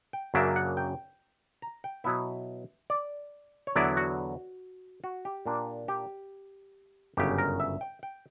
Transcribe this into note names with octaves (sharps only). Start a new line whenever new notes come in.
G5
F#2 C#3 F#3 A#3 D4 E5
F#5
G5
A#5
G5
B2 F#3 B3 E4 E5
D5
C#5
E2 D3 F#3 B3 E4 D5
F#4
F#4
G4
A#2 A#3 D4
G4
G1 F#2 C#3 G4
A#4
E5
G5
G5